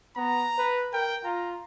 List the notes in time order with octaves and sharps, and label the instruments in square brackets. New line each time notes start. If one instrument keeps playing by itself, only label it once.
[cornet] B3 [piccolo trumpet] A#5
[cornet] B4
[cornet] A#4 [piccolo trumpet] G5
[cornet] F4 [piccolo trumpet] A#5